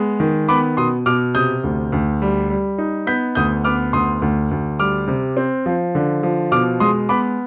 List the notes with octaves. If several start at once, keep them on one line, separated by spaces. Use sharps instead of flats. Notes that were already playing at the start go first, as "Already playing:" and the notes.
Already playing: G#3 B3
D#3
B3 B5 D6
B2 C6 D#6
B2 D6 F6
C3 D#6 G6
D2
D2
G3
G3
D#4
B3 G6 B6
D2 D#6 G6
B3 D6 F6
D2 C6 D#6
D2
D2
G3 D6 F6
C3
C4
F3
D3
F3
B2 D6 F6
G#3 C6 D#6
B3 B5 D6